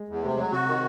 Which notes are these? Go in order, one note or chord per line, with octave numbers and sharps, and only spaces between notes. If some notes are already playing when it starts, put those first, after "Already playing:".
Already playing: G#3
E2
C3 A3
F#3 G#3
C3 F#4
D#3